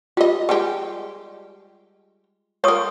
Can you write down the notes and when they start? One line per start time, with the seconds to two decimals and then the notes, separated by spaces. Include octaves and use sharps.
0.17 G3 F4 D#5
0.49 G3 G#3 G4
2.64 F4 A#4 C#5 C#6 D#6